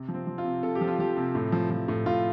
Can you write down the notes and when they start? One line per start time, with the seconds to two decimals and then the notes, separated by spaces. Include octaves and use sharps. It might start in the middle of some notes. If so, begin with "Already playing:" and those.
Already playing: C3
0.08 F3
0.14 C4
0.27 F3
0.38 F4
0.44 C3
0.62 C3 A4
0.75 G4
0.81 F3
0.88 F4
0.99 F3 G4
1.17 C3
1.35 A2
1.52 F3
1.70 F3
1.88 A2
2.06 A2 F4